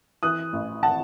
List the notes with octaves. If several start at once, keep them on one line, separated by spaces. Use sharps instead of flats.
E3 D#6 F#6
A1
F#5 A5